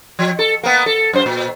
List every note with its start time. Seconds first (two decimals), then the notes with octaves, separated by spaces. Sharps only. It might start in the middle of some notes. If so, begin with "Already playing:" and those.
0.19 F3
0.39 A4
0.63 A#3 B3
0.86 A4
1.13 F#2 C5
1.26 A#2